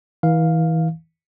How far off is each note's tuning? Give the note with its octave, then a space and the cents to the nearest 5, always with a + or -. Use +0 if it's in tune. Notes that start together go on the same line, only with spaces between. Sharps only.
E3 -35 F5 +0